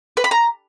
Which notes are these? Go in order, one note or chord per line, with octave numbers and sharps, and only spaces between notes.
B4
B5
A#5